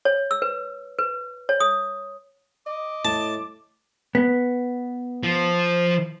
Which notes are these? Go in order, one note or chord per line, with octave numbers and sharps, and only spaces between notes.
C#5
E6
B4
B4
C#5
D#6
D#5 D6
A2 A5
B3
F3